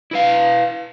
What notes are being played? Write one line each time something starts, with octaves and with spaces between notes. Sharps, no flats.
E4 B4 F5